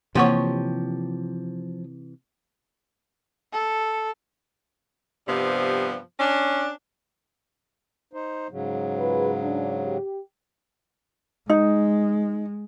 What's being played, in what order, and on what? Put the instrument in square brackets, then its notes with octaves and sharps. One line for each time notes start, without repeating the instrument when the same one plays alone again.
[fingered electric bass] C3 E3 [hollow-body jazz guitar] F3 G4 C#5 [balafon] A#3 F#5 C#6
[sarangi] A4
[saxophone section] G2 C3 F3 G3 B3
C#4 D4
[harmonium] D#4 C5
G#2 C#3 F#3
[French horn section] F4 G#4 B4
D4
G4
[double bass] G#3 [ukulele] D#4